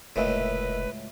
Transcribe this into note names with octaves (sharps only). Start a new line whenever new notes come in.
F1 C#2 A2 A#3 B4 D#5 E5